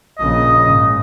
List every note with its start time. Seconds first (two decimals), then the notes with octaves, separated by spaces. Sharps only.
0.19 A#1 C#3 D#5
0.64 G#2 C#3